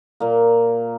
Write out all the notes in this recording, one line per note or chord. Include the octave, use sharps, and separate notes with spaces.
A#2 A#3